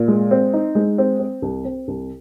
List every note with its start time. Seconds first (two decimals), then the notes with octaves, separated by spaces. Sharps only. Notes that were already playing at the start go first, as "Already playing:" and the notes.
Already playing: A#2
0.08 G#3
0.31 C4
0.54 D#4
0.75 G#3
0.98 C4
1.19 C4
1.42 C2
1.65 C4
1.88 C2